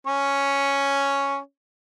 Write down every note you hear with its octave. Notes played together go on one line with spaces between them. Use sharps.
C#4 C#5